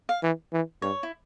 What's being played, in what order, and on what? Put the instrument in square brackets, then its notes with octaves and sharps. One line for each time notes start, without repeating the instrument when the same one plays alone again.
[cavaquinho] F5
[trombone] E3
E3
[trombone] G2 [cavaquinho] C#5
[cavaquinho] E4